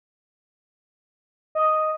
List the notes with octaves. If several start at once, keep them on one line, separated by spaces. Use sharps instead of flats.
D#5